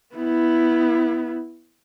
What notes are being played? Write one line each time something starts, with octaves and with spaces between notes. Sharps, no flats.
B3 E4